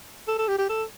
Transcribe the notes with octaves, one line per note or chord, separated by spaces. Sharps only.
A4
A4
G4
G4
A4